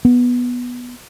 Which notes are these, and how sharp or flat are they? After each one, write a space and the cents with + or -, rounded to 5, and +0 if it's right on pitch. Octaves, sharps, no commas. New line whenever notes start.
B3 -10